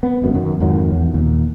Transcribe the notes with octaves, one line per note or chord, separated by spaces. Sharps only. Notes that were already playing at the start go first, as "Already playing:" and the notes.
B3
G#1 F#2
F#2 D#3 F#3
F2 G#2 D#3 F#3
E2
D#2 A#2